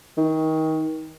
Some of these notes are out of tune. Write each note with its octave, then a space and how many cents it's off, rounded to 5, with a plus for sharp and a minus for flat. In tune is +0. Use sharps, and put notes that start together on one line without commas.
D#3 +25